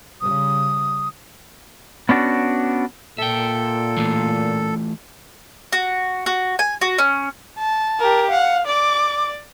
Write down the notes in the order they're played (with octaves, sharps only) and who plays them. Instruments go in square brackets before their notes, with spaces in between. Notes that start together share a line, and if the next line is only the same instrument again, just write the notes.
[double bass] C#3 G3 [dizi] D#6
[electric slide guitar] B3 C#4 D4 F#4
[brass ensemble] A#2 [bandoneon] A4 [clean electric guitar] E5 G5
[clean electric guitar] E3 A3 F4
[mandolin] F#4
F#4
G#5
F#4
C#4
[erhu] A5
[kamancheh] G4 A#4
[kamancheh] F5 [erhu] F#5
[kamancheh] D5 [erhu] D6